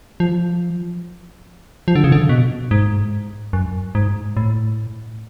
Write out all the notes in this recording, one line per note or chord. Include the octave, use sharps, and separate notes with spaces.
F3
F3
D3
C#3
D3
B2
G#2
F#2
G#2
A2